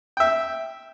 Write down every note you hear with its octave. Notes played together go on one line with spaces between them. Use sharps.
E5 G5